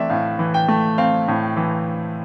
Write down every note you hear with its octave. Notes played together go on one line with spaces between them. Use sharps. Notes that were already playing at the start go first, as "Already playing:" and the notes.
Already playing: E3 A3 C4 D5 E5
A2 F5
E3
G5
A3
C4 F5
A2
E3